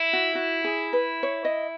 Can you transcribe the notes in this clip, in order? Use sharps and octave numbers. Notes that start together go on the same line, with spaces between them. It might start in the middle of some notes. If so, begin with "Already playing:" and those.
Already playing: E4
F#4
F#4
G#4
B4
C#5
D#5